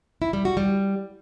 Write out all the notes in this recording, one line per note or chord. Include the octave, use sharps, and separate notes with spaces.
E4
G3
F#4
G3